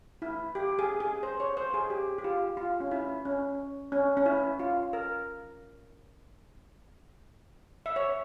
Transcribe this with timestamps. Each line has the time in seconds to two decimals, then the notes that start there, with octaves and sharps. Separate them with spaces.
0.22 E4
0.55 G4
0.79 G#4
1.00 G#4
1.23 C5
1.40 C#5
1.57 C5
1.74 G#4
1.90 G4
2.18 G4
2.24 F4
2.57 F4
2.80 C#4
2.91 E4
3.25 C#4
3.92 C#4
4.17 C#4
4.26 E4
4.59 F4
4.93 A#4
7.86 E5
7.96 C#5